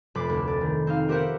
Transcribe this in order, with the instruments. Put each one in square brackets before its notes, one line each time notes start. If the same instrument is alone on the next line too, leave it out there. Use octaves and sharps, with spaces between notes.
[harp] F1 B5 D6 C7
D2
D5
D#3
C4 D#4 F5
B3 G4 A#4 C5 E5 F#5